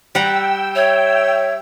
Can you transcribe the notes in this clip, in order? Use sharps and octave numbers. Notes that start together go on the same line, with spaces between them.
G3 F#5 G5 A#5 E6
C#5 E5